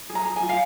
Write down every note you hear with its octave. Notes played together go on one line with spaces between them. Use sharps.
G#4
A#5
G#4
G#5
F4
F5